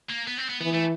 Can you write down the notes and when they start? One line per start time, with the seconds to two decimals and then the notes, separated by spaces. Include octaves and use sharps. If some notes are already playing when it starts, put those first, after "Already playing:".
0.10 A#3
0.27 B3
0.37 C4
0.49 B3
0.61 E3 B3
0.73 A3